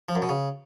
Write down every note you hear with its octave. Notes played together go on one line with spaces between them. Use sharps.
F3
F#2
B2
C#3